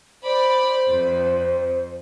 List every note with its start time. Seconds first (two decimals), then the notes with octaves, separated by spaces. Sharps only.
0.23 C5 D5 B5
0.91 F2